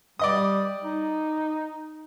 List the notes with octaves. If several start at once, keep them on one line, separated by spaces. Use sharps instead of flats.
G3 D5 D#5 D#6
D#4